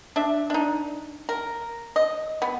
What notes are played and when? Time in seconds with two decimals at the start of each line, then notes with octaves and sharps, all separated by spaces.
0.16 D4 E5
0.50 D4 D#4
1.29 A#4
1.96 D#5
2.42 B3